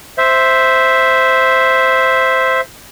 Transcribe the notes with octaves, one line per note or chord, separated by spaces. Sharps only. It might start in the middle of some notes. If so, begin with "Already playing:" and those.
C5 E5